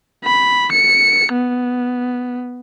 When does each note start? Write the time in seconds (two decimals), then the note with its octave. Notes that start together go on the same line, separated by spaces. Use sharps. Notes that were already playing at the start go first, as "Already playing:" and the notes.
0.24 B5
0.72 C#7
1.33 B3